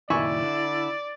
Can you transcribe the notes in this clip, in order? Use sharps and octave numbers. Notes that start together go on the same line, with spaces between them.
F#1 A#2 D#3 E4 D5 G#5 C#6
D3